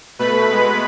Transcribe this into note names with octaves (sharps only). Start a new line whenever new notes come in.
B2 A3 B4 B5
B2 G#3 B3